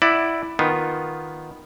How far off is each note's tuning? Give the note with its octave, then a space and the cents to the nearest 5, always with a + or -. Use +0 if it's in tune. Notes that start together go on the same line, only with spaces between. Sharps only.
E4 +0 D5 +15 F#5 +20
D#3 +0 B3 +0 F4 +0